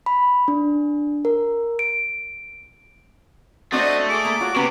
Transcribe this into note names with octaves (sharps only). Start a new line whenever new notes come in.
B5
D4
A#4
D7
A3 C4 D4 F#4 C5 D#5
G#4 D6
A#3
F4 F#4 C#5
C3 A#3 B3 C#4 B4